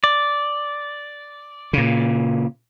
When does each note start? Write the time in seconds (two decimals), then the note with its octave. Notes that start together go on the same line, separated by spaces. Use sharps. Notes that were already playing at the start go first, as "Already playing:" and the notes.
0.04 D5
1.73 A#2 C#3